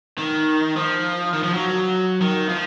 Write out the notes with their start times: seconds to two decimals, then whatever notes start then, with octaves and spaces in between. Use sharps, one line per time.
0.19 D#3
0.77 F3
1.33 D#3
1.44 F3
1.54 F#3
2.21 D#3
2.49 F3